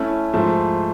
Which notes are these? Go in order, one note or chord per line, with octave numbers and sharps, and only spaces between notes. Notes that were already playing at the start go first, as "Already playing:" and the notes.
Already playing: A3 C#4 E4
G#2 F3 A3